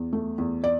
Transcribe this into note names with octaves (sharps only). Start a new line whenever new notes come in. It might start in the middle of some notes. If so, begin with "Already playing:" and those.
Already playing: E2
A3
E2
D5